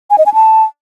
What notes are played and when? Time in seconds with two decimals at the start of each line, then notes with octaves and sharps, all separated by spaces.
0.10 G#5
0.18 D#5
0.26 G#5
0.34 A5